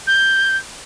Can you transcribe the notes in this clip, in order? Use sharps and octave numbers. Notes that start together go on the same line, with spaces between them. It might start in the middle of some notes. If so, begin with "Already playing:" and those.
G6